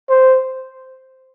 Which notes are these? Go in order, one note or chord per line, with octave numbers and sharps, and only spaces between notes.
C5